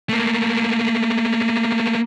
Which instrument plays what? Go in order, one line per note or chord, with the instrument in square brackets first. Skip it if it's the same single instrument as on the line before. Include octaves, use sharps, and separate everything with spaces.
[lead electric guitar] A3 A#3